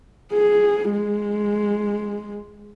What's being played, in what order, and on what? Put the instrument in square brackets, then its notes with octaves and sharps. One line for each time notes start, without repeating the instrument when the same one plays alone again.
[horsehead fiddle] G#4
G#3